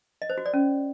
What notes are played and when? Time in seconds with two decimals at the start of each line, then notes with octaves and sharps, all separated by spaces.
0.22 D#5
0.30 C5
0.38 F#4
0.46 D5
0.54 C#4